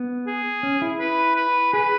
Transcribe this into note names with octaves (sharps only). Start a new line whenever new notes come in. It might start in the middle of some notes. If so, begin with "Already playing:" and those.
Already playing: B3
G#4
C#4
E4
B4
B4
G#4 B4